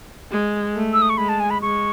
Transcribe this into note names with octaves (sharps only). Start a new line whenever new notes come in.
G#3
A3
E6
D#6
C#6
G#3 B5
A5
G#5
B5
G#3 C#6